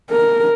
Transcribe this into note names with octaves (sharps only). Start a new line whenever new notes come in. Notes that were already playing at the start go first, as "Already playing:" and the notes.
A#4